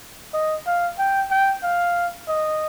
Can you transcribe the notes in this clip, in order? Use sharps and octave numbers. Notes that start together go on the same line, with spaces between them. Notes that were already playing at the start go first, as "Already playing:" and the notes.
D#5
F5
G5
G5
F5
D#5